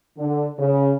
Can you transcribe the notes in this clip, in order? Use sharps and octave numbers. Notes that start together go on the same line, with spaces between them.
D3
C#3